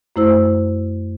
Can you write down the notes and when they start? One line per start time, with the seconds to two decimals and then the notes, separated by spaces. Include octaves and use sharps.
0.16 F#2 A3 E4 C5 E6